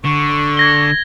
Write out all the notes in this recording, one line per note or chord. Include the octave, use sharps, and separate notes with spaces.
D3 C#6
G#6 A#6 G7